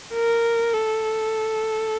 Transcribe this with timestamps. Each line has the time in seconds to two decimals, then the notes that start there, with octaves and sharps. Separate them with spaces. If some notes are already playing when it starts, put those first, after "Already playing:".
0.14 A#4
0.75 A4